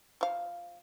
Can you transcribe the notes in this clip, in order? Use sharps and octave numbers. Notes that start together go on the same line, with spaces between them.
F3 F5